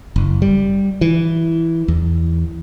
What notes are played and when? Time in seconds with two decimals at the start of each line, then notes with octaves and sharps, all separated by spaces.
0.16 F#1
0.42 G3
1.01 E3
1.88 E2